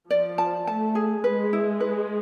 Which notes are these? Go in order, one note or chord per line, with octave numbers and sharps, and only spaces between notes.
F3 D5
A5
A3 A5
G#4
G#3 B4
E4
B4